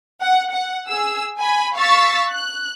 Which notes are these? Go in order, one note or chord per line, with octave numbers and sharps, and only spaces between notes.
F#5
F#5
G#4 E6
G#5 B5
F5 C#6 E6 A6 B6
F#6